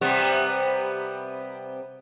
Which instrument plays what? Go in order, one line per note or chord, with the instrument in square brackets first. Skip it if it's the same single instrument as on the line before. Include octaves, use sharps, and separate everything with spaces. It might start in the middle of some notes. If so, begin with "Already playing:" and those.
[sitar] C3 G3 B3